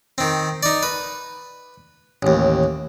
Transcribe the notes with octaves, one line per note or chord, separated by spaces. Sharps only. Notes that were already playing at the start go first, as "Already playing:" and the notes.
D#3 C4
D#4 D5
B4
A1 D#2